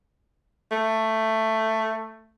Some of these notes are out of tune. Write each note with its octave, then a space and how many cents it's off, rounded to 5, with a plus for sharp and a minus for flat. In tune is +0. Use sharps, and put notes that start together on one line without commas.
A3 +10